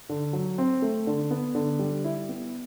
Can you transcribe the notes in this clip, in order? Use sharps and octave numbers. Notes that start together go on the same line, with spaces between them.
D3
F#3
C4
A3
D3
B3
D3
G3
E4
B3